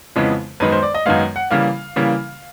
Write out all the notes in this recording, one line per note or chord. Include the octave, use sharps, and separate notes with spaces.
F2 C#3 E3 G#3 B3
F#2 D#3 G#3 B3 B4
C5
D5
D#5
F#2 D#3 G#3 B3 F5
F#5
C#3 E3 G3 A#3 F5
C#3 E3 G3 A#3